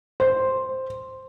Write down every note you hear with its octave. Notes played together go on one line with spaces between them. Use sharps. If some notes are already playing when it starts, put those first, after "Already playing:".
C5